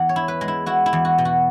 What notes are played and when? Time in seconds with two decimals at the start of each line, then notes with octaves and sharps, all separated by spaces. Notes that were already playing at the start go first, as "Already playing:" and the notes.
Already playing: E2 F#5
0.09 C#5
0.16 E4
0.28 B4
0.41 G#3
0.48 E4
0.66 E4 F#4
0.86 E4
0.93 E2
1.05 F#4
1.18 B2
1.25 F#4